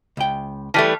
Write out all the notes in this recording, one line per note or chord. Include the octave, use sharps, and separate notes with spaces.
C#2 G5
E3 G3 A3 A5 F6 B6